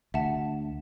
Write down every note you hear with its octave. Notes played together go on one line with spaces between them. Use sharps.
D2 E5 F#5 A5